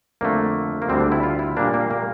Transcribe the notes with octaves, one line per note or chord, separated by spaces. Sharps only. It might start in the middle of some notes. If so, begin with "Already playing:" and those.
F2 D3 A3 A#3
A#3
D2 D3 G3 C4
D4
E4
F4
E4
A#2 G3 A#3 D4
A#3
A#3